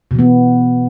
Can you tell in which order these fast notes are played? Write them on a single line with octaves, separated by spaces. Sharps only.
B2 E3 B3